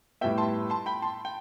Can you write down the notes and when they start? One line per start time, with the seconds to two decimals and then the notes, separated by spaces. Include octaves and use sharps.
0.21 A2 G3 B3 E5 G5
0.38 A5 C6
0.70 A5 C6
0.86 G5 B5
1.02 A5 C6
1.25 G5